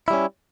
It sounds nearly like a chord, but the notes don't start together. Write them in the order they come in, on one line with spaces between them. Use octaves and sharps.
E4 G3 C#4